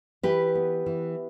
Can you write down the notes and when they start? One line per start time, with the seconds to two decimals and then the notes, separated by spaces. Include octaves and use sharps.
0.23 E3 G4 B4
0.55 B3
0.86 E3